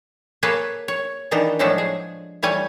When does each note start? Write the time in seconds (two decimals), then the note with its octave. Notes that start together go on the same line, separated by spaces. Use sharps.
0.43 A#3 G#4 A4 B4 C#5 G#5
0.88 C#5
1.31 D#3 E3 B3 D4 D#4
1.59 A2 F3 F#3 G#3 A3 D4
1.78 G#4
2.43 E3 G3 A3 C#5 G#5